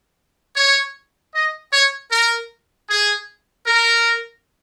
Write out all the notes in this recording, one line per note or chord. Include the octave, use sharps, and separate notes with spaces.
C#5
D#5
C#5
A#4
G#4
A#4